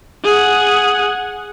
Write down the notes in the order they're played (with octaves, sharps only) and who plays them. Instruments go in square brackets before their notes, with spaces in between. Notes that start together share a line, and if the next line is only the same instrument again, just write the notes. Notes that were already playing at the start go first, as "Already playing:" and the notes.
[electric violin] G#4 F#5